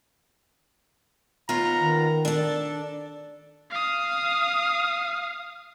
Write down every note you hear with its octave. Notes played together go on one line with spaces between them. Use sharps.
D#2 B3 F4 A#5
D#3
D4 A4 D5
F5 D#6